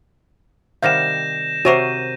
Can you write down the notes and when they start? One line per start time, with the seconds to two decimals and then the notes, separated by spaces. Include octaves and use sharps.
0.83 C3 D#3 G3 F5 F#5 G6 A#6 E7
1.65 C3 F#4 A#4 C5 C#5 D6 D#7